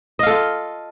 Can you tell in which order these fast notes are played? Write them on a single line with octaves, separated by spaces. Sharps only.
D#5 F5 A4 F4